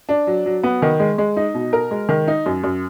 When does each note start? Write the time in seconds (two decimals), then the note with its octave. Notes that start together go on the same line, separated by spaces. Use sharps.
0.09 D4
0.27 F#3
0.46 F#3
0.63 B3
0.82 D#3
1.00 G#3
1.18 G#3
1.37 D#4
1.55 B2
1.73 A#4
1.91 G#3
2.09 D#3
2.28 D#4
2.46 F#2
2.64 F#2